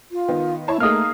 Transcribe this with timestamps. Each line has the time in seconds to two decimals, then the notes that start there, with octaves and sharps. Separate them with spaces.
0.12 F4
0.28 D#3 B3
0.68 E4 C#5 A5
0.80 A3 A#3 D#4 G#4 D#6 F6